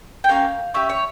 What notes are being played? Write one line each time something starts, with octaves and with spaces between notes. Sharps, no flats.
G5
A#3 C#4 G4 F5
C#4 G4 E5
C#5